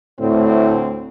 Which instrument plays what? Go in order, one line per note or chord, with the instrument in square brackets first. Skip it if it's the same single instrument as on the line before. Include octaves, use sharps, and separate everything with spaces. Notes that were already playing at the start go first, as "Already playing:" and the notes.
[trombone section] D2 C4 [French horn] A2